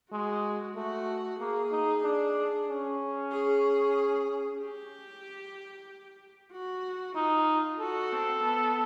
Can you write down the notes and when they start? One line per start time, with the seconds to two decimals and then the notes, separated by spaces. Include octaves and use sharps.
0.12 G#3 F#4
0.76 A3 F#4
1.40 A#3 G#4
1.72 D#4
2.03 D4
2.68 C#4
3.32 G#4
4.60 G4
6.52 F#4
7.16 D#4 F4
7.80 F#4 A4
8.12 C4
8.44 B3